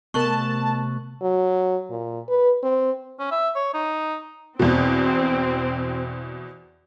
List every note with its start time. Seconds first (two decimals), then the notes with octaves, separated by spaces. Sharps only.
0.14 C3 A3 B3 A#4 A5 C#6 F#6 F#7
1.21 F#3
1.90 A#2
2.29 B4
2.63 C4
3.19 C#4
3.31 E5
3.55 C#5
3.74 D#4
4.59 E2 B2 C4